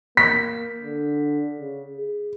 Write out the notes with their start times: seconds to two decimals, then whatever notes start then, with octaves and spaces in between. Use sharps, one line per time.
0.17 A#3 B6
0.82 D3
1.60 C#3
1.97 G#4